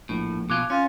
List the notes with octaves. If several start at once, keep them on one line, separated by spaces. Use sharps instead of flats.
A#1 A2
B2 F4 D6 F#6 G#6
C#4 F4